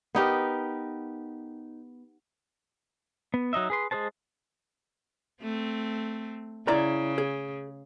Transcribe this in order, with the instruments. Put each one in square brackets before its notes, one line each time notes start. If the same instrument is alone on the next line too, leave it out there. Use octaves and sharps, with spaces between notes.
[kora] B3 D#4 G4 A#4
[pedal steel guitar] B3
F#3 D#4 D#5 E5
G#4 B4 C6
G#3 G#4 B4 C5 A5
[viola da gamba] A3 C4
[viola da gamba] C#3 [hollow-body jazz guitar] E4 D5 A#5
[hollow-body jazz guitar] G#4